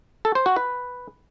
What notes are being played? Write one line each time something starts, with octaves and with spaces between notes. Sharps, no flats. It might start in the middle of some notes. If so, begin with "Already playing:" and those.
A4
C5
F#4
B4